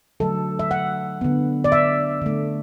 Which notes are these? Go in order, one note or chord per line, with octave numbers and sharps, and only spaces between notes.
D3 F#3 A3 A4
E5
F#5
D3 B3
D5
E5
D3 A3